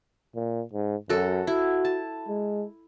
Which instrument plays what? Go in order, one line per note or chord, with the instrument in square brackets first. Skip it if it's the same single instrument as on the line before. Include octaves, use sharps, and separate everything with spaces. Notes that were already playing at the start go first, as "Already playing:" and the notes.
[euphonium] A#2
G#2
[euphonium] F#2 [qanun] F#4 A4
[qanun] E4 [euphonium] F#4
[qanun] A5
[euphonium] G#3